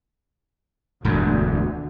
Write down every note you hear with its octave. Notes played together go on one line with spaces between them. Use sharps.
E1 D2 G2 B2 D3